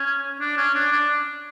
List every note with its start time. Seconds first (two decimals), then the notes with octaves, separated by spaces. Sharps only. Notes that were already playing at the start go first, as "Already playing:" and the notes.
Already playing: C#4
0.40 D4
0.57 C#4
0.74 D4
0.92 D4